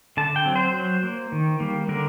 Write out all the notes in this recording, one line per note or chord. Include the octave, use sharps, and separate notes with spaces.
D3 A5
G5
F#3 C4
C5
F#3
A#3
D#3
G3 A#3
D3 A#4